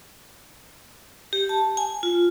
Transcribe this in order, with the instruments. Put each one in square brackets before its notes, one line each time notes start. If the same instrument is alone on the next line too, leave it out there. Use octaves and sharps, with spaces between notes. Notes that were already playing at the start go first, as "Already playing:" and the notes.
[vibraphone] G4
A5
G#5
F4